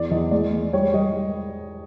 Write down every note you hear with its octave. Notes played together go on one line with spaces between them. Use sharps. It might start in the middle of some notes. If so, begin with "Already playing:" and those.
Already playing: E2 D5
E2 D#5
G#3 D5
G#3
G3 C#5
G3 D#5